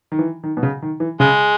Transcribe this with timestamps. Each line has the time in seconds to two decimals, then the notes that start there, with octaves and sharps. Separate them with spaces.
0.12 D#3
0.19 E3
0.44 D#3
0.57 B2
0.63 C#3
0.82 D#3
1.00 E3
1.20 C#3 G#3